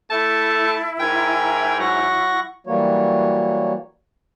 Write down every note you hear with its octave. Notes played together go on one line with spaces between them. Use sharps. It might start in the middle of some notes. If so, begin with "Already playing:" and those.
A3 E4 A5
G#2 A#4 G5 G#5 G#6
F#3 F#5 C#6 A#6
E3 F#3 G3 A#3 F#4 C#5